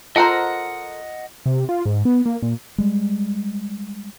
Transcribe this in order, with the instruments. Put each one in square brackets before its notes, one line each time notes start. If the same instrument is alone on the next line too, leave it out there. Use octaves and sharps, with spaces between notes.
[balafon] F4 A#5 [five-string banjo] A4 A#4 C5 [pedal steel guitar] D#5 F#5 F#6
[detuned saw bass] C3
F4
G#2
B3
A#3
A#2
[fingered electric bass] G3 G#3